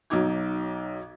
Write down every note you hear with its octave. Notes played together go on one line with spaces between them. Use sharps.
B1 F#3 D#4 D6 G#6